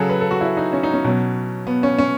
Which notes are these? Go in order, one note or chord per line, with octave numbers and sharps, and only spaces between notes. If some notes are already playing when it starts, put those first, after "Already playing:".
Already playing: C#3 F#3 G#4 A4
B4
A4
F#4
E4
D#4
C#4
D#4
C#4
B2 F#3
B3
C#4
C#4